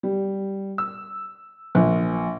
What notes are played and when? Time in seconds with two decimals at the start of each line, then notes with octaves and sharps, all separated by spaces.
0.03 G3
0.78 E6
1.75 A#1